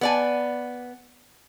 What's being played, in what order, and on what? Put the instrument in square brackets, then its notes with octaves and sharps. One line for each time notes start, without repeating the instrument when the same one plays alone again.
[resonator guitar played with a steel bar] B3 D5 G#5